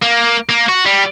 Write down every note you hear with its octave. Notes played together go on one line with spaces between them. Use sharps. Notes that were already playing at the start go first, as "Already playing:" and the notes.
A#3
A#3
F#4
G3